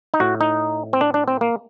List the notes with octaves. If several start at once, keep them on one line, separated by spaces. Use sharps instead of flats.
D#4
A2 F#4
D#4
C4
D4
D4
C4
A#3